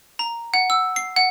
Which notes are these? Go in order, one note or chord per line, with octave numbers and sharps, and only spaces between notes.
A#5
F#5
E6
C7
F#5